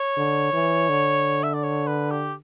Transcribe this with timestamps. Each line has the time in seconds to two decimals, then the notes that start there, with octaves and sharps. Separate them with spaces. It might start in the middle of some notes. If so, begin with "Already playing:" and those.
Already playing: C#5
0.17 D3
0.53 E3
0.89 D3
1.43 E5
1.54 D5
1.63 C#5
1.87 B4
2.11 G4